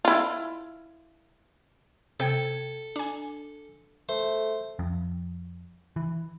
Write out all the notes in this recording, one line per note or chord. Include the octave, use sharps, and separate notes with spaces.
E4 F4
C3 A4 G5 G#6
D4 G#5
A3 C5
F2
E3